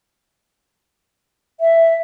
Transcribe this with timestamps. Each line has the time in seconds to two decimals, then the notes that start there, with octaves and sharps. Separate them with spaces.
1.60 E5